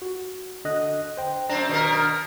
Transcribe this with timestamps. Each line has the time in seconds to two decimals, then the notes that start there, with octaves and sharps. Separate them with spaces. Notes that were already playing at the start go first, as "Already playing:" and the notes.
0.02 F#4
0.65 D3 D#5 F#6
1.17 C5 G5
1.50 F#2 C4 D4 A#5
1.69 B2 D#3 A#4